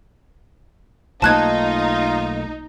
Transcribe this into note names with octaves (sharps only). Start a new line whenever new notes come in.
B1 A3 A#3 D#4 F4 A5 F#6 G#6